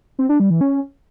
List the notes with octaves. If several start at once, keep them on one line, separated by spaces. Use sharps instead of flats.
C4
D4
G3
E3
C#4